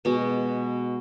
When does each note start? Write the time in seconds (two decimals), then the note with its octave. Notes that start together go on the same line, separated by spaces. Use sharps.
0.05 B2 G#3 B3